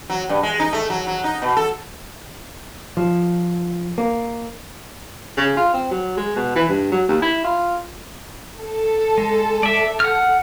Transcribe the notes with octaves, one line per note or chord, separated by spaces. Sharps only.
F#3
G2
G#3
D#4
A3
F#3
F#3
D#4
B2
A4
F3
A#3
C#3
F4
C4
F#3
G#3
B2
E3
G2
F#3
D#2
E4
F4
A4
G#3
D5 E5
F#5 F6